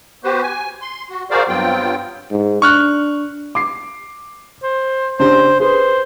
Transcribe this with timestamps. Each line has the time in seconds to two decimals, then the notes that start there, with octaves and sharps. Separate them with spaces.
0.24 B3 F#4 G4 B4 C5
0.42 G#5
0.81 C6
1.10 F#4
1.31 F#4 G#4 A#4 C5 D5 F5
1.49 G2 F#3 B3 C4 F4 G5
2.31 G#2
2.62 D4 C#6 F6 F#6
3.55 D6 C7
4.63 C5
5.19 C#3 D4 G4 C5
5.60 G#4 B4 C5